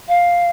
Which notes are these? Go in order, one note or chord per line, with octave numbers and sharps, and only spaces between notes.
F5